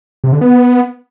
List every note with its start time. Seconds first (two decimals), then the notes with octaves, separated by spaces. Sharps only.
0.24 C3
0.32 D3
0.41 B3